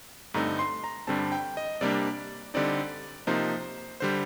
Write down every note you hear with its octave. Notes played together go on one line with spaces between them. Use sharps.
G2 D3 A3 C4 D#4 A#5
C6
A#5
G2 D3 G3 C4 A5
G5
D#5
C3 G3 A#3 D4 D5
D3 G3 C4 D#4 D5
C3 F3 A#3 D#4 C5
D3 G3 C5